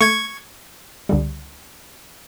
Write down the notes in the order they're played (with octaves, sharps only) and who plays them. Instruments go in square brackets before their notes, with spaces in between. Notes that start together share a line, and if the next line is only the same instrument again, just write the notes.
[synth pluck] A3 [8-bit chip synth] C#6 G#6
[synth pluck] C#2 D3 G3